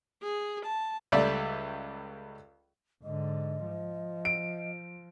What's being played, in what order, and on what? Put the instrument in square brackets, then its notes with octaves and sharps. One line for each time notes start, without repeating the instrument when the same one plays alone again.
[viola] G#4
A5
[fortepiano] C#2 G3 A3 D5 E5
[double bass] G#2 D3 [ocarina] D#5
[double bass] F3
[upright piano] D7